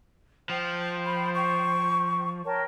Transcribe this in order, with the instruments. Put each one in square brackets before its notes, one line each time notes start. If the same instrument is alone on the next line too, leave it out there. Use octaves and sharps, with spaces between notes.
[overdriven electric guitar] F3 [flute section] C5 G5
[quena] B5
C#6
[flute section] A#4 G5 A5 [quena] C#5